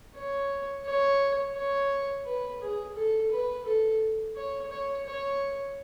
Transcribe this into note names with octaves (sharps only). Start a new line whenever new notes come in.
C#5
C#5
C#5
B4
G#4
A4
B4
A4
C#5
C#5
C#5